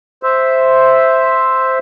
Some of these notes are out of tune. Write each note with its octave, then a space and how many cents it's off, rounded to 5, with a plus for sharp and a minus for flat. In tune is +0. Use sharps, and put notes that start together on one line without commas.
C5 +0 E5 +0